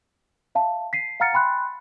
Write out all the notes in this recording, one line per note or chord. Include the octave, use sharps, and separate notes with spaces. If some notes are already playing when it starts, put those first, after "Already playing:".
E5 F5 A5
B6 C7 D#7
F5 F#5 A#5 F6 A6 C#7
G5 G#5 B5 C6 F#6